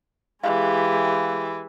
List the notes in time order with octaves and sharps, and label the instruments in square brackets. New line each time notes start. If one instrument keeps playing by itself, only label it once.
[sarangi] E3 [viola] G#3 G4 [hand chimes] F5